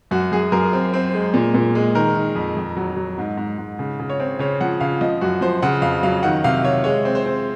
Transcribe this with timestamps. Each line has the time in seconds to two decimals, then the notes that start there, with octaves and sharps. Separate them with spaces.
0.11 F#2 F#4
0.32 F#2 G#4
0.52 F#2 A#4
0.73 C4
0.94 C4
1.14 G#3
1.34 A#2
1.54 A#2
1.75 G#3
1.95 D#3 A#4
2.16 D#3
2.35 F2
2.57 F2
2.77 F#3
2.96 F#3
3.18 G#2
3.37 G#2
3.58 G#2
3.79 C#3
4.00 C#3
4.10 C#5
4.20 C4
4.39 C#3 C#5
4.61 F3 F#5
4.80 C#3 F5
5.01 F3 D#5
5.21 F#2 F#4
5.41 F3 C5
5.62 C#3 F#5
5.82 F2 F5
6.03 F#3 F5
6.23 D#3 F#5
6.44 C3 F5
6.63 C3 C#5
6.84 G#3 C#5
7.05 C4
7.15 C5
7.26 C4